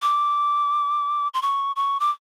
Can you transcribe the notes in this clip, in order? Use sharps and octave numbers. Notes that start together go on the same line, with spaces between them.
D6
C6
C#6
C#6
D6